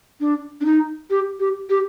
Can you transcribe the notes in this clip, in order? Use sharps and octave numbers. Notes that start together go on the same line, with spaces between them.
D4
D4
D#4
G4
G4
G4